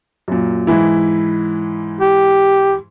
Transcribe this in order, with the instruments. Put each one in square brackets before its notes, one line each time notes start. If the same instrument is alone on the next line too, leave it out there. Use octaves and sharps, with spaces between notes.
[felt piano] F#2 A#2
G#2 E3 E4
[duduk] G4